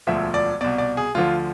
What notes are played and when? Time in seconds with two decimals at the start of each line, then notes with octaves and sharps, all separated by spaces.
0.07 E1 D2 D3 F3 E5
0.34 D5
0.61 C2 B2 D5
0.78 D5
0.97 G#4
1.15 D2 D3 F3 F4